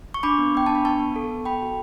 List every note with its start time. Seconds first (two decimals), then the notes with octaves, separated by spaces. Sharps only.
0.14 C#6
0.23 D4 B5 D6
0.39 B3
0.55 B3 G5
0.66 D4 A5
0.75 B5
0.85 B3 A5 C#6
1.00 B3
1.16 A4
1.31 B3
1.45 A4 G5 B5
1.62 F#4